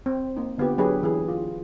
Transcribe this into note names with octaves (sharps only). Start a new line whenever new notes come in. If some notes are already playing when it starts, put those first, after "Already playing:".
C4
A#3 D#4
D3 B3 F4 G4 B4
F#3 D4 G4 G#4 B4 C#5
E3 G#4
F4